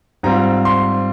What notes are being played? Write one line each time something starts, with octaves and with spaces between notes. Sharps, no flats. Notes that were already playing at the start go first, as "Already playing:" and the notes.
G#2 G3 C4 F4 A#5
C6